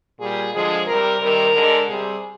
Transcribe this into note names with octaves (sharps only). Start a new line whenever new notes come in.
A#2 G3 G#4
D3 F3 G#3 G#4
C3 G3 A#4
C3 D#3 G3 A#4
D3 G#3
C3 G3 G#4